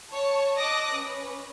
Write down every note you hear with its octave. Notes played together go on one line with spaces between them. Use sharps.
C#5 A5
D#5 A5 D6 D#6 F#6 A#6
C#4 B4